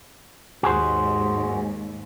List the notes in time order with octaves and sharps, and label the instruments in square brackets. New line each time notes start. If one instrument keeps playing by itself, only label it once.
[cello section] D#2 G#2 [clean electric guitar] F#4 G#4 C5